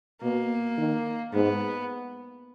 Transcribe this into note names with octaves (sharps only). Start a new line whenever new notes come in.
B2 A#3
D#3
G#2 B3